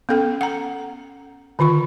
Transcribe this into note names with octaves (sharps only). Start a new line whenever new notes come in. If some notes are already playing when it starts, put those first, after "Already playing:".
B3 C#4 A4 G5
F#5 A#5
D3 D#3 F4 C#6